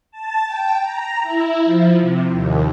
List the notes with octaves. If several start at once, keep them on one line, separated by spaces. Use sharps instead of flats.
A5
G5
A#5
E4
F3
C3
D#2